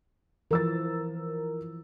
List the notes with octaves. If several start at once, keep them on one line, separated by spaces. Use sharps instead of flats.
E3 F3 A#4 E6 A6